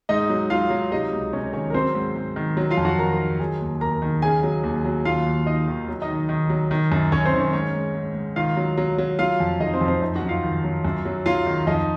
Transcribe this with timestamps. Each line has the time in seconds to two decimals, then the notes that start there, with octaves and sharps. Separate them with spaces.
0.09 G#2 D#4 D#5
0.30 F#3
0.50 F#3 F4 F5
0.70 F#3
0.91 C3 D#4 D#5
1.12 C#2
1.33 C3 C#4 C#5
1.53 D#3 C#4 C#5
1.70 A#4
1.74 F#3 C4 C5
1.95 G#2
2.16 G#2
2.36 D#3
2.57 F#3
2.71 F4 F5
2.78 F2
2.85 F#4 F#5
2.98 D#3 A#4 A#5
3.19 D#3
3.40 F#3 G#4 G#5
3.60 D#2
3.81 D#2 A#4 A#5
4.02 D#3
4.22 C#3 G#4 G#5
4.43 F#3
4.64 D#2
4.85 F#3
5.05 D#2 F4 F5
5.26 D#2
5.46 D#3 D#4 D#5
5.68 D#3
5.88 F#3
6.02 D#4 D#5
6.08 D#3
6.29 D#3
6.50 F#3
6.71 D#3
6.92 F#2
7.12 F#2 C#4 C#5
7.26 C4 C5
7.33 D#3
7.39 C#4 C#5
7.53 G#2 C#4 C#5
7.75 G#2
7.95 G#2
8.15 G#2
8.36 D#3 F4 F5
8.57 F#3
8.78 F#3
8.98 F#3
9.19 F#3 F4 F5
9.40 F2
9.60 F2 D#4 D#5
9.74 C4 C5
9.81 F2
9.88 C4 C5
10.02 F#2 D#4 D#5
10.15 F#4 F#5
10.22 F#2
10.29 F4 F5
10.43 D#3
10.64 F#3
10.85 F#2
11.05 F#3
11.26 F#3 F4 F5
11.46 D#3
11.67 F2 D#4 D#5